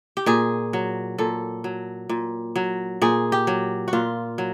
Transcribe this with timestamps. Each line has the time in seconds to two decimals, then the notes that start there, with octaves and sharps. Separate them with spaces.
0.17 G4
0.26 A#2 G#4
0.73 F#3
1.18 A#2 A4
1.64 F#3
2.09 A#2
2.56 F#3
3.02 A#2 G#4
3.32 G4
3.47 F#3
3.88 F#4
3.93 A#2 F4
4.38 F#3